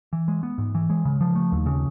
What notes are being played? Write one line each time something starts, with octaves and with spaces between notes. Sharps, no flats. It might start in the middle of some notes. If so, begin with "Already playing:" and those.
E3
G#3
B3
G#2
E3
G#3
C#3
F3
A3
D#2
C#3